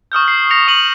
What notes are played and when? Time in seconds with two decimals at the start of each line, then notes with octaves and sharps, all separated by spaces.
0.12 C#6 D#6 F6 G6
0.28 C7
0.50 A#6 C#7 F7
0.67 D#6 D#7 F#7